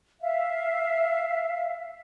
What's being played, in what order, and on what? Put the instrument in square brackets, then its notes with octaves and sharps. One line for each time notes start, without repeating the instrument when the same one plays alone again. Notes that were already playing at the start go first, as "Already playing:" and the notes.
[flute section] E5 F5